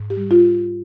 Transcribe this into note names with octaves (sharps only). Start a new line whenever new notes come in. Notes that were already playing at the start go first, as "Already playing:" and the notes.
Already playing: G#2
G4
G3
F4